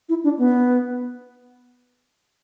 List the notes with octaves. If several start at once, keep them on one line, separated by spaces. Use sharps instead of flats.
E4
D4
B3